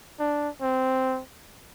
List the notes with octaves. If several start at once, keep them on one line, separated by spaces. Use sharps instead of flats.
D4
C4